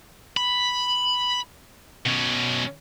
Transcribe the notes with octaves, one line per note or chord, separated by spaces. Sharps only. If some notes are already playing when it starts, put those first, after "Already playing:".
B5
B2 C#4